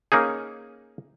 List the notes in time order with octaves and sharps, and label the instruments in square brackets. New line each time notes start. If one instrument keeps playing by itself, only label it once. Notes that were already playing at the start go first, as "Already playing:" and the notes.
[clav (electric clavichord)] A#3 C#4 D#4 G#4